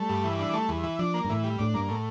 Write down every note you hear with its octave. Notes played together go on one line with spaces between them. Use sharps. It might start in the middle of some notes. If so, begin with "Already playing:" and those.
Already playing: G3 A3
G2
E3
D4
A3
E2
E3
F3 D4
A#3
G2
A2 E3
G3
A2 D4
G2 A#3
A2